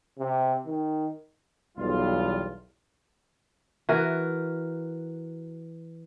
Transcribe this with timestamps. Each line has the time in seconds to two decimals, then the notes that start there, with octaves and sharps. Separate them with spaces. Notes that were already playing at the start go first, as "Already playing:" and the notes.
0.18 C3
0.66 D#3
1.78 B1 E2 G3 F4
3.89 E3 F#4 A#4